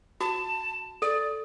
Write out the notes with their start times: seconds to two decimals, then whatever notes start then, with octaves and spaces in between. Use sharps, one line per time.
0.21 F#4 A5
1.02 A4 D5